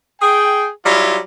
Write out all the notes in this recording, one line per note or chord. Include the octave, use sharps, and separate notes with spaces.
G#4 G5
F#3 G3 E4 F4